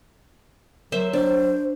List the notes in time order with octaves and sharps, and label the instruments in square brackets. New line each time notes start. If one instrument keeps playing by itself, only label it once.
[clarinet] F#3 [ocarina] A#4 [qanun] C5 E5
[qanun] D4 [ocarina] C5